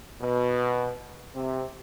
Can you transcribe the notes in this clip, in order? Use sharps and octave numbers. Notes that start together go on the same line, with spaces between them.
B2
C3